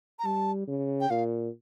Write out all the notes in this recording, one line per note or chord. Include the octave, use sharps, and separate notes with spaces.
A#5
G3 A5
C#3
G5
A#2 F5